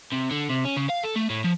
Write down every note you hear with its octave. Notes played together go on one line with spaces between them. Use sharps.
C3
D3
C3
C#4
C#3
F5
A4
A3
A2
F3